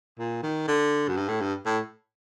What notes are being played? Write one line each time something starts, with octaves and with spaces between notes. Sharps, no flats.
A#2
D#3
D3
F#2
G2
A2
G2
A2